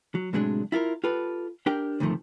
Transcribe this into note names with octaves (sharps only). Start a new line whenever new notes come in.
F#3
A2 C3 F#3 G#3 D4
E4 F4 A4 A#4
F4 G4 A4 B4
D4 G4 A#4 G5
D2 G2 C3 D#3 F3 A3